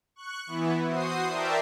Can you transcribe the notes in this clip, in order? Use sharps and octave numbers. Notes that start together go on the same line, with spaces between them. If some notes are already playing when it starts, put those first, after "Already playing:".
C#6 F#6
E3 B3 E4
F#4 C5 D#6 C7
A#4 C5 D5 E5 G5 A5